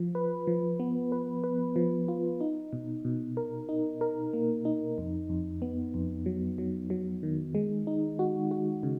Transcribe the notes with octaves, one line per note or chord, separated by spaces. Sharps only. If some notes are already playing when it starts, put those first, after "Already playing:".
Already playing: F3
B4
F3
B3
B4
B4
F3
F4
D#4
B2
B2
A#4
D#4
A#4
A#3
D#4
F2
F2
B3
F2
F#3
F#3
F#3
D#3
G#3
D#4
F#4
F#4
C#3